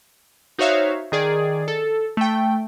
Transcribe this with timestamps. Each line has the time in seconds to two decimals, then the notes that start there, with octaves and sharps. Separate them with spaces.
0.58 D#4 F#4 C5 C#5 E5 F5
1.12 D#3 G#4 D5
1.68 A4
2.17 A3 G5